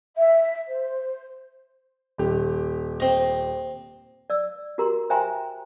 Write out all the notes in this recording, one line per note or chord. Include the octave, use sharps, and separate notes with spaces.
E5
C5
D#1 G4
C4 D#5
D5 E6
F#4 G4 A#4 A#5 C6
C5 E5 G5 G#5 A#5 C6